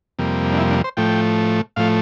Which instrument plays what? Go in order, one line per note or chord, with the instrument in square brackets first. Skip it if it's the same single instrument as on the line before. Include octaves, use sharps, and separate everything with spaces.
[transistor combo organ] F2 C3 G3 A#3
D4
E4
D4
C5
A2 F3 A3 G5
A2 F3 A3 F5